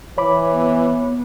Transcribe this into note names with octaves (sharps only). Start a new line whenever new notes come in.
E3 C#5 B5 D6
B3